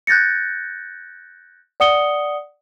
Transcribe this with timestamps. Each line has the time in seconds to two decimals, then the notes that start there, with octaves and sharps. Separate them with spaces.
0.07 F#6 G6 A6 A#6 C#7
1.80 D5 F#5 D#6 C#7 G7